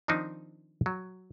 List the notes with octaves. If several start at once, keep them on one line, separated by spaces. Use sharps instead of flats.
D#3 F3 C4 D4 D#4
F#3